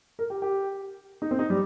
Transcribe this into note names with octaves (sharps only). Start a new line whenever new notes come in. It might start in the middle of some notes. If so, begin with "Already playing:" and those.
A#4
G4
G4
D#4
C4
D#4
G3